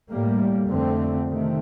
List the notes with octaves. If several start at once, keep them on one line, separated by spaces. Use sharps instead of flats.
A2 G3 A#3
F2 D3 A3 C4
C3 D#3 A3 C4